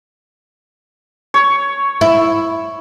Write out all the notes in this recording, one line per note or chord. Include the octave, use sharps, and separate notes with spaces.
C#5
E4